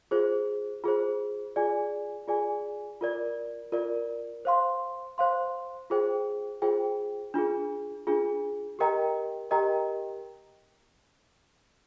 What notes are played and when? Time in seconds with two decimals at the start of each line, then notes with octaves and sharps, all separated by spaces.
0.11 F4 G#4 C5
0.84 F4 G#4 C5
1.56 F4 G#4 D5 G#5
2.28 F4 G#4 D5 G#5
3.01 F4 A#4 D5
3.72 F4 A#4 D5
4.45 C5 F5 C6
5.18 C5 F5 C6
5.90 F4 G#4 C5 G5
6.62 F4 G#4 C5 G5
7.34 D4 F4 G#4
8.07 D4 F4 G#4
8.79 G4 A#4 D#5 G5 A#5
9.51 G4 A#4 D#5 G5 A#5